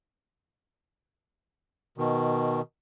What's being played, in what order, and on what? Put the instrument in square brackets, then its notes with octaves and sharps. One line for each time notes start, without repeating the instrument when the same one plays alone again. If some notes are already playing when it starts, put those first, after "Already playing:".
[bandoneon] B2 D#3